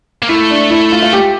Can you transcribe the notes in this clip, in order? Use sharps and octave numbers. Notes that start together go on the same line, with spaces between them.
A#3
A3 E4
D4
E4
F4
F4
G4